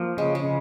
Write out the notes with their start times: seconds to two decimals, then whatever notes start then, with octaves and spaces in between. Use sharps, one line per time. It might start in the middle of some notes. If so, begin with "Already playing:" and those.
Already playing: F3 A#3
0.17 C#3 G#3
0.35 G#3
0.44 C#3